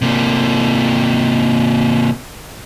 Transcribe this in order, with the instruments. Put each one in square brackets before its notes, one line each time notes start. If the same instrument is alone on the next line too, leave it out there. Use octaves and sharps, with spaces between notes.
[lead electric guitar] C3 A#3